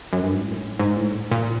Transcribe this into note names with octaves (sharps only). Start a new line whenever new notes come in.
F#2
G2
G#2
A2
G#2
A2
A#2